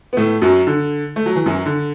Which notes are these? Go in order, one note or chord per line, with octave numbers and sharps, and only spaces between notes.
B3
A2 A3
F#2 F#3
D3
A3
F#3
E3
F#2 F#3
D3